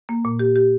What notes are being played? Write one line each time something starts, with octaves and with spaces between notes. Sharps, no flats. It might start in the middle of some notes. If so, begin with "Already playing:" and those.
A#3
A#2
G4
G4